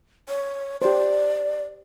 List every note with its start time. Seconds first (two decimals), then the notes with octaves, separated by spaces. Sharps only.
0.29 C#5
0.82 G4 C5 D5